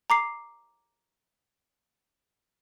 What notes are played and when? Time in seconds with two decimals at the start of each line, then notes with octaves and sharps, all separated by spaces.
0.10 A#5 D6 C7